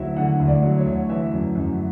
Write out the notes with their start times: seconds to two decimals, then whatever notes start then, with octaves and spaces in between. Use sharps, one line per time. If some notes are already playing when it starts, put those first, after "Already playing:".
Already playing: D2 D3 F#3 E4 F#4 E5
0.16 D3 F#5
0.40 D2
0.48 D5
0.63 F#3
0.78 C#5
0.86 D2
1.09 E3 E5
1.33 F#2
1.55 F#2